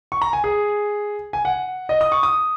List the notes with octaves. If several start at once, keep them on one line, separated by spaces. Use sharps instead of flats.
C#6
A#5
G#5
G#4
G#5
F#5
D#5
D#6
C#6
D#6